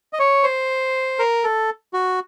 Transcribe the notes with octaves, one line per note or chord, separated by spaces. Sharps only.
D#5
C#5
C5
A#4
A4
F#4